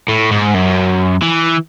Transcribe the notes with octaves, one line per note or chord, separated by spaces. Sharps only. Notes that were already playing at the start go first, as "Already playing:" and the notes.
A2
G#2
F#2
E3